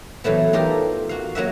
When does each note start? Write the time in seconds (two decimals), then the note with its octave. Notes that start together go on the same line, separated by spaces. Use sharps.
0.24 E3 F#3 A3 B3
0.53 D#4 F4 G4 A4 A#4
1.09 F#4 F5
1.35 F#3 A#3 F#4 E5